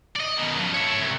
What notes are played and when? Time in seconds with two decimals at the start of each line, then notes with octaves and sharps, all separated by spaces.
0.16 D5 D#5
0.37 B2 D#3
0.56 F#2 F3
0.74 C#5 E5
1.00 C2